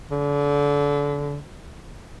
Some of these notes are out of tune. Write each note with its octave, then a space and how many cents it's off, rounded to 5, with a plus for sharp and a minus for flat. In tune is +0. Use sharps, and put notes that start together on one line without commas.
D3 -30